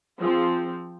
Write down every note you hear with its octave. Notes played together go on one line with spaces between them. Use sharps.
F3 C4 F4 G#4